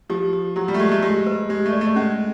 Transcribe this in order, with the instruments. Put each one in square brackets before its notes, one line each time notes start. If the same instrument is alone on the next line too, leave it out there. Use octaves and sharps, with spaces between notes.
[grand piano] F3 [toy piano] G4
[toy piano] G4
[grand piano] F#3 [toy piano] G4
[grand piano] G3
A3
[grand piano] G#3 [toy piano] G4
[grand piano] A3
[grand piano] G#3 [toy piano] G4
[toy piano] B4
[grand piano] G#3 [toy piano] G4
[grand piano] A3
[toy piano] D5
[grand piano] A3
[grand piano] G#3 [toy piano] C#4